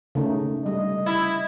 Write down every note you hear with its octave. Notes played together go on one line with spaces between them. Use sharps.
C#3 A3 D#4
G3 D#5
E4